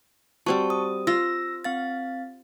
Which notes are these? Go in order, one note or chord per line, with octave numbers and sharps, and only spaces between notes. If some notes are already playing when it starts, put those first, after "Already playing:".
G3 C4 F#4 A5 C#6
D#6
F4 E6 A#6
C4 F5 A6